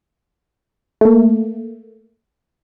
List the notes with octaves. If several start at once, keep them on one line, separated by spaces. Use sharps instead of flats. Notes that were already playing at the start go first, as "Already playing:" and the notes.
A3 A#3